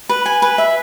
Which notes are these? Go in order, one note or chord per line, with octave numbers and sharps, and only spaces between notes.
B4
G#5
B4
E5